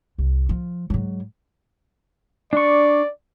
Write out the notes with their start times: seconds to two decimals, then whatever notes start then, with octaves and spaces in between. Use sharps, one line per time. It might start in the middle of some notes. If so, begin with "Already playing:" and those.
0.18 C2
0.49 F3
0.90 G#2 F#3
2.53 D4 D5 C#6